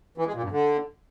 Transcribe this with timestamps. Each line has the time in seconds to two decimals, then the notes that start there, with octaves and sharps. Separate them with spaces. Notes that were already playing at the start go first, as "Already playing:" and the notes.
0.18 E3
0.26 G#3
0.35 A#2
0.43 G2
0.51 D3